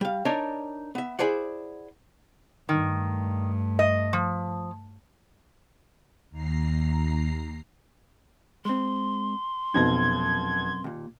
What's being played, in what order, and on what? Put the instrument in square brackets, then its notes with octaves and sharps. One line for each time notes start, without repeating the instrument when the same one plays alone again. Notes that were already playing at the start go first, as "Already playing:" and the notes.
[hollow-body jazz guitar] G3 F5
D4 D#4 A#4 C#5 D5
B3 E5
E4 G#4 C5 D5 F#5
[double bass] G2 A3 [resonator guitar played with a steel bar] D#3
[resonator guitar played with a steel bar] D#5
F3
[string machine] D#2 A#5 C7
[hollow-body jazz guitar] G#3 C4 [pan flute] C6
[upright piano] F1 B2 D#4 [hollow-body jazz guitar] F#2 C4 A#5 [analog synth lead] G#6
[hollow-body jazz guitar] D#2 A#2